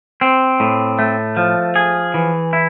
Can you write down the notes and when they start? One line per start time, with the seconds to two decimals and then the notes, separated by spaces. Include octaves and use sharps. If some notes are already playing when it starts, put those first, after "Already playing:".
0.21 C4
0.60 A2
0.99 A3
1.37 F3
1.76 G#4
2.14 E3
2.53 E4